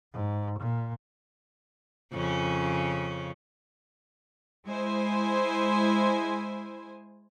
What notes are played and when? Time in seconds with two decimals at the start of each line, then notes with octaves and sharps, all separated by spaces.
0.13 G#2
0.59 A#2
2.13 F2 C#3 C#4
4.67 G#3 E4 C5 G#5